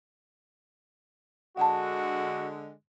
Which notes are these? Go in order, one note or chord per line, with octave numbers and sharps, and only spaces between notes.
D3 G#3 F#4 F#5 A5